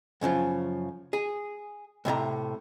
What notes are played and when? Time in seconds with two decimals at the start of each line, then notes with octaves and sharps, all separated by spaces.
0.21 F#2 C#3 E3 F3
1.13 G#4
2.05 A2 C3 E5 A#5